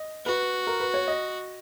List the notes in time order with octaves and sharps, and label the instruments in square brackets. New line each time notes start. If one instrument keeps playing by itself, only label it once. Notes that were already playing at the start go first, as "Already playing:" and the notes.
Already playing: [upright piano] D#5
[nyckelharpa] F#4 [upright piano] B4
[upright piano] A#4
B4
C#5
D#5